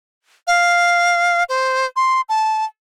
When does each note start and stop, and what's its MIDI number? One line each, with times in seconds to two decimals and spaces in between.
0.47 1.43 77
1.49 1.86 72
1.96 2.21 84
2.29 2.64 81